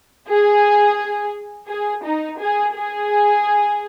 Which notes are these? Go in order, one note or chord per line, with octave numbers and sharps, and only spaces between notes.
G#4
G#4
D#4
G#4
G#4